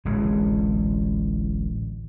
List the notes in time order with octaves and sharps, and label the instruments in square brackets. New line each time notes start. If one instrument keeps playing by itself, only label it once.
[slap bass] D1 A1 G#3